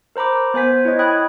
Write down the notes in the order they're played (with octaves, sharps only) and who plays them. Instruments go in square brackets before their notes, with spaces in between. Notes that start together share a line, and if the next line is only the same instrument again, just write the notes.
[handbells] A#4 C5 A#5 B5 D6
B3 C5 G#5 B6
E4 C#5 D#5
G5 B5 D#6 F#6 G#6